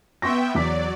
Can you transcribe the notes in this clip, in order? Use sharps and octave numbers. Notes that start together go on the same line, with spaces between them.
B3 E5 G5 C6 C#6 A#6
E2 F#3 D5 D6 B6